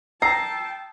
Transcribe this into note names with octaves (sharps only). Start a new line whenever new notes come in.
G5 A5 A#5 E6 C7